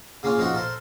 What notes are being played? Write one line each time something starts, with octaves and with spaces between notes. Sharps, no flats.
C#3 A#3 C#4 F4
F3 A#3 D#4 F4 F#4
A4 A#4 C5